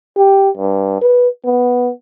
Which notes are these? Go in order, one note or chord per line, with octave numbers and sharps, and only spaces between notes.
G4
G2
B4
B3